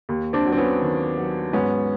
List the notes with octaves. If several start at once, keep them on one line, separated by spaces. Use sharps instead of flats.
D#2
C4 D4
F#3
C4
B3 C#4
D#3
F#3
G#2 B3 C#4